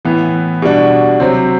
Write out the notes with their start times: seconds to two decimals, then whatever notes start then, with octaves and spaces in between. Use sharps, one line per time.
0.05 A2 E3 B3
0.62 B2 G3 D4 F#4
1.20 C3 F#3 C4